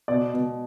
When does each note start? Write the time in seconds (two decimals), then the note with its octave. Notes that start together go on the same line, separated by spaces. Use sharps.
0.08 B2 D5
0.34 B2